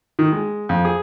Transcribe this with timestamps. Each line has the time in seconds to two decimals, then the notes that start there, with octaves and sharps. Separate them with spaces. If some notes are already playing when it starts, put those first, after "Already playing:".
0.19 D#3
0.32 G#3
0.69 F2
0.85 G#4